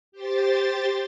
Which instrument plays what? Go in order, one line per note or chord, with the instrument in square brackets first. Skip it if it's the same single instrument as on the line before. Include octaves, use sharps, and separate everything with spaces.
[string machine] G4 C5 A6